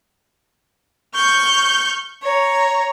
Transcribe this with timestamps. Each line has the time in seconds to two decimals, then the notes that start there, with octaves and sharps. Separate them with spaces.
1.15 C#6 F6 G6
2.23 C#5 A#5